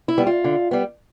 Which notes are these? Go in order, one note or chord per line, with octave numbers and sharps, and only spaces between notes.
E4
G3 B3
F4
D3
G3 B3